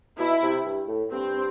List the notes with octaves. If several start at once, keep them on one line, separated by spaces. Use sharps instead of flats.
B2 E4
C3
G2
A2
G2 C4